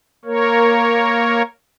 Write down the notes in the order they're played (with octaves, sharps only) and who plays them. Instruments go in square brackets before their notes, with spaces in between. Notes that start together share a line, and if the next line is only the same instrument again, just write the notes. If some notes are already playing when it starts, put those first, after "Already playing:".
[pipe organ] A#3 A#4 C#5